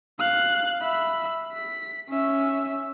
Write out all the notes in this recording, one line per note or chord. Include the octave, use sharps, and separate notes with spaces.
F5 F#6
E5 B5
B6
C#4 E5